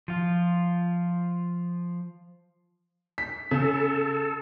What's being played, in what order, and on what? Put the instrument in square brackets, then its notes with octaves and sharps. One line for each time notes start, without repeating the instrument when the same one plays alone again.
[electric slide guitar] F3 F4
[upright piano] B6
[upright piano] C#3 [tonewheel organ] A4